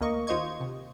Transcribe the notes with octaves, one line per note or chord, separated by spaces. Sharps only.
D2 A#3 D#5 C#6
D#2 F4 C5 D#5 C#6 G#6
C3